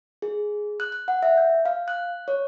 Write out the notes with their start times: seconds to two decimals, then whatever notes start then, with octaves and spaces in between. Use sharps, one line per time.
0.22 G#4
0.80 F#6
0.92 F#6
1.08 F#5
1.23 E5
1.37 G6
1.66 F5
1.88 F#6
2.28 C#5